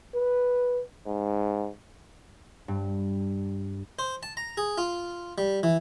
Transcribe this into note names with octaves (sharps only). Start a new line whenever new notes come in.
B4
G#2
G2
C5
A5
A#5
G#4
F4
G3
E3